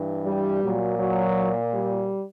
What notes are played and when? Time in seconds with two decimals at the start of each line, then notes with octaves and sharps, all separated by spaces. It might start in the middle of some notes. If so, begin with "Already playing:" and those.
Already playing: G2 E3
0.26 G3
0.63 A#2 F#3
0.99 F#3
1.74 G3